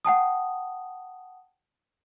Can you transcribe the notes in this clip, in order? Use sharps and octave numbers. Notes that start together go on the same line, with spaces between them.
F#5 G5 A5 D#6